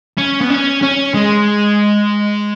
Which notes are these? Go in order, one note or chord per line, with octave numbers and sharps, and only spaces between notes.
C#4
B3
C#4
C#4
G#3